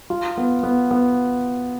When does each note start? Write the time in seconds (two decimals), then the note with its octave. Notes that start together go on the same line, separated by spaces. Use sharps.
0.10 F4
0.38 B3
0.63 B3
0.91 B3